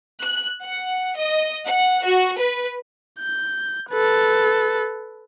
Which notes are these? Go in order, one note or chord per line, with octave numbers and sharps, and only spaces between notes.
F#6
F#5
D#5
F#5
F#4
B4
G6
A4 B4